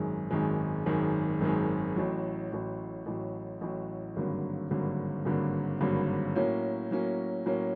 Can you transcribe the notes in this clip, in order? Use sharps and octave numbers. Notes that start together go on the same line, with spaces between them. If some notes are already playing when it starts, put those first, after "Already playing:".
Already playing: G#1 F#2 D#3 G#3
G#1 F#2 D#3 G#3
G#1 F#2 D#3 G#3
G#1 F#2 D#3 G#3
A1 A2 F#3
A1 A2 F#3
A1 A2 F#3
A1 A2 F#3
G#1 G2 D3 F#3 A#3
G#1 G2 D3 F#3 A#3
G#1 G2 D3 F#3 A#3
G#1 G2 D3 F#3 A#3
A2 F#3 A#3 C#4
A2 F#3 A#3 C#4
A2 F#3 A#3 C#4